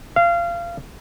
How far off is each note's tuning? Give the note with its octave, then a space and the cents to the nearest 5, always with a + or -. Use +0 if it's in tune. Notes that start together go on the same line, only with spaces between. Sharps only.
F5 -25